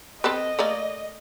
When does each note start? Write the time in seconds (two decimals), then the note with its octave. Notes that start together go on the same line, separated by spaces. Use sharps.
0.24 C4 A4 B4 D#5
0.59 A3 A#3 D5